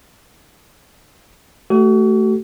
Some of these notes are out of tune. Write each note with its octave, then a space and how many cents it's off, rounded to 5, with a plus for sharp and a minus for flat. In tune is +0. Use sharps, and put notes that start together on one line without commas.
A3 +0 F#4 +40 A4 -5